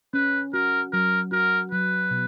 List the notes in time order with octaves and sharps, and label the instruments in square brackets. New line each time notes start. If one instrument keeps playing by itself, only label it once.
[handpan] C#4 [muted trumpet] B4
[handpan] F#4 [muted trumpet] A#4
[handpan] F#3 [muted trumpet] A#4
[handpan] F#4 [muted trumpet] A#4
[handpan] F#3 [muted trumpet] B4
[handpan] B2